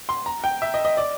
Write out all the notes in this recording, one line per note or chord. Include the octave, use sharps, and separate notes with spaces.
C6
A#5
G5
E5
D#5
D#5
D5